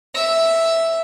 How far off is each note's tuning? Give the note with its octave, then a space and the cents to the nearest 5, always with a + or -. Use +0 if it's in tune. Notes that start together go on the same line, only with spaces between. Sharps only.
E5 +0